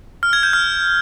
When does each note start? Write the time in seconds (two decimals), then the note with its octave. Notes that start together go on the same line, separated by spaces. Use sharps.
0.23 F6
0.33 G#6
0.43 G6
0.53 F6